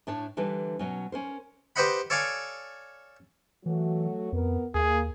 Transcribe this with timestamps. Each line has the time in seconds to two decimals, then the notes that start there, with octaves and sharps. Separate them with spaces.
0.07 A2 D4 C#5 A5
0.37 D3 E3 G3 D4 B4
0.79 B2 F#3 C#4
1.12 C#4 A#4 C5
1.76 G4 B4 C5 D#5 F#5 B5
2.10 A4 C#5 D5 F5 G#5
3.66 E3 F#3 A3 F#4
4.32 F2 B3 A#4
4.74 D#2 A#3 G#4